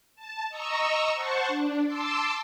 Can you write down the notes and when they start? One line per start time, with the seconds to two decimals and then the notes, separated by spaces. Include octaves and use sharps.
0.15 A5
0.49 D#5 A#5 C#6 E6
1.14 C5 F#5 A5 C#6
1.48 D4
1.86 A5 C6 D6 E6